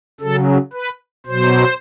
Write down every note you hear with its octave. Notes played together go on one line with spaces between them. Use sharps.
C#3 F#3 A4
B4
B2 F#3 C5